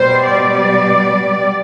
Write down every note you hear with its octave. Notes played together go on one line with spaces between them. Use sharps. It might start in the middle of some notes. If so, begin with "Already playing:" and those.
Already playing: B2 G3 C5
D5